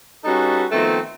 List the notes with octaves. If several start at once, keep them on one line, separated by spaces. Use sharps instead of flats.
G3 C#4 D#4 F#4 A4 B4
D#3 F3 A3 B3 C4